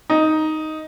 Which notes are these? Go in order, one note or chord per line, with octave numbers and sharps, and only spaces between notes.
D#4